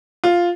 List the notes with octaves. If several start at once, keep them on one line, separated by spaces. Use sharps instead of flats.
F4